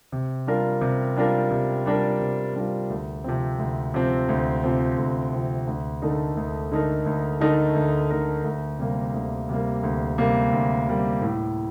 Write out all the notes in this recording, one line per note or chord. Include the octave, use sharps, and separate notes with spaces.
C3
G3 D4 F4 A#4
C3
G3 D4 F4 A#4
C3
G3 D4 F4 A#4
C3
G3 D4 F4 A#4
D2
C3 F3 C4
D2
C3 F3 C4
D2
C3 F3 C4
D2
C3 F3 C4
D2
D3 A3 D#4 A#4
D2
D3 A3 D#4 A#4
D2
D3 A3 D#4 A#4
D2
D3 A3 D#4 A#4
D2
C3 G3 A#3
D2
C3 G3 A#3
D2
C3 G3 A#3
D2
C3 G3 A#3
A2